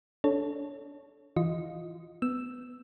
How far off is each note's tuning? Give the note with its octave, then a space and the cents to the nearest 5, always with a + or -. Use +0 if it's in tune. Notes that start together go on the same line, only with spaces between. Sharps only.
D4 -20 A4 -10 C#5 +0
E3 +0 F4 +5 D#5 +0
B3 +15 E6 +0